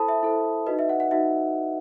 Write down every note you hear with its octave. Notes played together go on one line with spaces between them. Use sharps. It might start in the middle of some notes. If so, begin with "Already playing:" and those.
Already playing: E4 A4 C5 A5 B5 D#6
E5
E4 A4 C5
D#4 F#4 B4 D#5
E5
F#5
F#5
D#4 F#4 E5